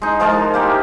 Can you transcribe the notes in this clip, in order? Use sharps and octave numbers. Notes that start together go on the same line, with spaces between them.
G#3 D#4
F3 G#3 A#4 A5
A#3 G4 E5